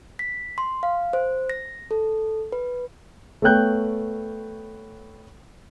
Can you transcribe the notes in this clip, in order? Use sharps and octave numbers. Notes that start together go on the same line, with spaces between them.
B6
C6
F5
C5
A#6
A4
B4
A3 B3 C#5 G5 F#6 G6